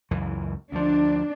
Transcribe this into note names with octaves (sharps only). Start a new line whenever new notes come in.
C#2 F#2 E3
D2 F3 D4